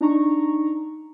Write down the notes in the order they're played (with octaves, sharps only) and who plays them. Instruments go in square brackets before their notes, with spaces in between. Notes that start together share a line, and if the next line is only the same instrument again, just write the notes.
[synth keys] D4 D#4 A#5 C#6